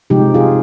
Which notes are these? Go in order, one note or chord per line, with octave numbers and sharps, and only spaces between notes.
C3 F3 G#3 D#4 G4
F4 G#4